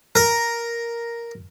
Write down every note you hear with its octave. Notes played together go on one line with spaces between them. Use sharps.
A#4